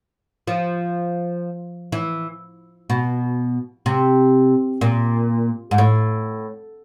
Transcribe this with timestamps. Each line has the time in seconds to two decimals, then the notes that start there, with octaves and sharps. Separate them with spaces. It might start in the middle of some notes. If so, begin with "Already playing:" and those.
0.47 F3
1.92 E3
2.90 B2
3.86 C3
4.81 A#2
5.71 G#2
5.78 A2